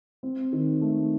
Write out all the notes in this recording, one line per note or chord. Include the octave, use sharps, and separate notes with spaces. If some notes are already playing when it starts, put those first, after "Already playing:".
C4
D#3
A3